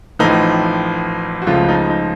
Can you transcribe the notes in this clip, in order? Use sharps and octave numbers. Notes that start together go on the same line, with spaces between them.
A1 A2 F3 D#4
F#4
C#2 C#3 F3 A3 F4
D#4
D#4